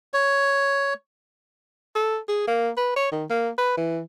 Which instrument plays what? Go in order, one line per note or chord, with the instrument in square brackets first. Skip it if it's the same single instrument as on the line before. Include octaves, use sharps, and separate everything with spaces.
[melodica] C#5
[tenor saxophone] A4
G#4
A#3
B4
C#5
D#3
A#3
B4
E3